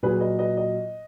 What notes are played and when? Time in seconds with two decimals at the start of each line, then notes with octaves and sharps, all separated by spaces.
0.03 A#2 F#3 G#4 B4
0.20 B4 D#5
0.39 B4 D#5
0.57 D#5